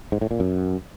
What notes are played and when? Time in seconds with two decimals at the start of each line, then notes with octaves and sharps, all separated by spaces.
0.12 G#2
0.21 A2
0.31 A#2
0.40 F#2